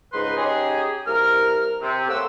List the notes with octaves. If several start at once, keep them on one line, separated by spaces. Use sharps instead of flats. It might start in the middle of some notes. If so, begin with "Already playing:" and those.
C#2 G#2 D#4 B4 C6
C#4 D#4 G4 G#4
C2 A#4 F6
C3
A3 A#3 C5 C#5 F#5 E6